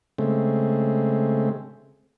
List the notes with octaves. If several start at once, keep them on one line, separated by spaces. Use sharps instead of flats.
C#3 G#3 A3 C4